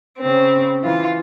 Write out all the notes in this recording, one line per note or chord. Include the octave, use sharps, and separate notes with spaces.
C#3 C4
E3 F4